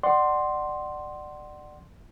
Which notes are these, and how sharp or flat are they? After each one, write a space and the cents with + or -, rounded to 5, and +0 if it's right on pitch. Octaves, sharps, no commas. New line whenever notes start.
D5 +25 F#5 +20 C6 +0